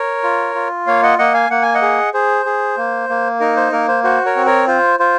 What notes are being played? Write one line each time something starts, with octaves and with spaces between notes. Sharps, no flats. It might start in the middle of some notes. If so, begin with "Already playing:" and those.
Already playing: A#4 C#5
F4
F4
A#3 C#5 F5
D#5 F#5
A#3 D#5 F#5
F5 G#5
A#3 F#5
G#5
D#5 F#5
G#4
G#4 C5
G#4
A#3
A#3
D#4 A#4
C5
A#3 A#4
C5
F#4 C5
A#4 C#5
C4
A#4 C#5
F4 C5
F4 C5